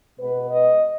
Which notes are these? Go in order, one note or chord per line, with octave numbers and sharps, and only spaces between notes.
B2 G#3 B3 B4
D#5